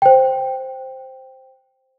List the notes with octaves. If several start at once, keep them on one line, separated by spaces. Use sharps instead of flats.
C5 G5